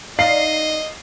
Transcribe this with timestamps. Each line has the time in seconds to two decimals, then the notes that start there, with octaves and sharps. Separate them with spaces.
0.19 D#4 D5 D#5 F5 C7